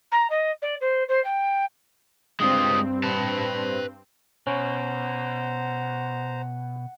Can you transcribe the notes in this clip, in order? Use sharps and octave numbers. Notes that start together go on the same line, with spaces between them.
A#5
D#5
D5
C5
C5
G5
G2 G#3 C4 F4 D#6
B4 A5 B5
B2 C#4 C5 F#5 A#5